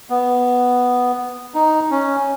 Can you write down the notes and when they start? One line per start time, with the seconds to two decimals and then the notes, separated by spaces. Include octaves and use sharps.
0.10 B3
1.54 D#4
1.91 C#4